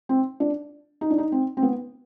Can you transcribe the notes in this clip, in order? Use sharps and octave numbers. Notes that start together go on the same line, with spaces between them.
C4
D4
D#4
D4
D#4
C4
C4
B3